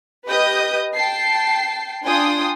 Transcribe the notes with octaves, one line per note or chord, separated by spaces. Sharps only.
G4 B4 D#5 D#6 G6
G5 A5 C7
D4 F4 G5 G#5 C6 D#6